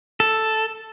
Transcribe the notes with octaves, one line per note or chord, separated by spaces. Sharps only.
A4